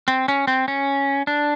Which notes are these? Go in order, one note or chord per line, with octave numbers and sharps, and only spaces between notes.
C4
C#4
C4
C#4
D4